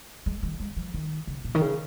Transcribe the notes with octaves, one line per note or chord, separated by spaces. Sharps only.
G#3
D#3
G#3
F3
D#3
C#3
A#2
D#3
C#3